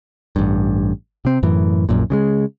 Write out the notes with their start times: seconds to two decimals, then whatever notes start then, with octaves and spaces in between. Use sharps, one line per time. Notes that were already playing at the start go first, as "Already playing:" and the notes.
0.36 A1 G2
1.25 C3 C4
1.43 F#2 A2 E3
1.89 A#1 F#2 A#2
2.10 C#3 G3 G#3